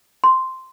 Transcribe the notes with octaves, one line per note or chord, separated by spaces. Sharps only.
C6